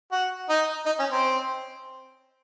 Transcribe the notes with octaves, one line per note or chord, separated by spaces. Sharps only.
F#4
D#4
D#4
C#4
C4